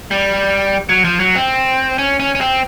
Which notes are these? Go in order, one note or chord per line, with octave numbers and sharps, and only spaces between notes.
G3
F#3
F3
F#3
C4
C#4
C#4
C#4
C4